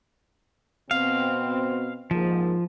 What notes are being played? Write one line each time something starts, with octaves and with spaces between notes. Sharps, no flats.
B2 C4 F5
G#2 F3 A#3